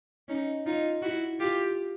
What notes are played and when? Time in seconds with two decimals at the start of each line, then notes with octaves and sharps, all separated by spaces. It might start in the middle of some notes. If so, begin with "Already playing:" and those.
0.28 C#4 D#4
0.66 D#4 F4
1.02 E4 F#4
1.39 F4 G4